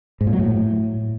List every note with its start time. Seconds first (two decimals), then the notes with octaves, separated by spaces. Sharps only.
0.21 G#2
0.27 A#2
0.33 F#3
0.39 A2